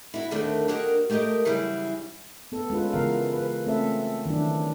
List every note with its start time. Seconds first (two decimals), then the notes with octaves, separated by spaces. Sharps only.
0.14 E4 F#4
0.31 D#2 D3 D#3 A3 B3 D4
0.68 A#3 D4 F#4 G4 A#4 D#5
1.10 A3 G4 A#4 C5 D#5
1.45 C#3 E3 F#3 G3 E4 G#4
2.52 B3 A4
2.70 G#3 C#4 F4 B4
2.93 C#3 E3 B3 A#4 F5
3.33 B4
3.67 A3 C4 C#4 A4 E5
4.26 D#3 E3 F#3 D4